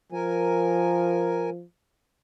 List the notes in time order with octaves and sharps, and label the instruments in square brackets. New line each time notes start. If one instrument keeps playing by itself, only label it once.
[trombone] F3 [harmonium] A#4 G#5